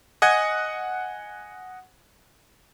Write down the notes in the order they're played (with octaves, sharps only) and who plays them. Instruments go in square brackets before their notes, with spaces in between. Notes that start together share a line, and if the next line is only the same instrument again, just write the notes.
[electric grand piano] D#5 F#5 G#5 G#6